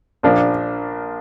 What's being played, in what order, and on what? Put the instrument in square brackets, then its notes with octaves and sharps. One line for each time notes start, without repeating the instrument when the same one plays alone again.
[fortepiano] A#1 A#2 F3 D4